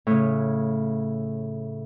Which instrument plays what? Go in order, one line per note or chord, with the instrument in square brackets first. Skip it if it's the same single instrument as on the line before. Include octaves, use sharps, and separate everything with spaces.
[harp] A2 C#3